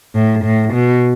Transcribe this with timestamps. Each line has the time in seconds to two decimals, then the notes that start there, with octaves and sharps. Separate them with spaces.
0.15 A2
0.44 A2
0.73 B2